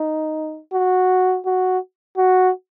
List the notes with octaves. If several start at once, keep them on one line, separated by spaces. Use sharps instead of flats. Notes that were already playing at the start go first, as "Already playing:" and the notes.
Already playing: D#4
F#4
F#4
F#4